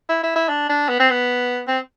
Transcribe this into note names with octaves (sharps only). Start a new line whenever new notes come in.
E4
E4
E4
D4
D4
B3
C4
B3
C4